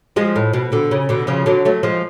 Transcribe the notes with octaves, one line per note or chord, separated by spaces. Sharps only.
F3 G#3
A2
B2
B2 D3
C#3
B2 D3
C#3 F3
D3 F#3
F#3 A3
F3 G#3